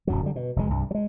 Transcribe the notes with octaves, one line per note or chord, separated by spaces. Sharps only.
D1 F#2 F#3
D3 G3
B2
F1 D2 A#2 G#3
C2 G2
F#3 G#3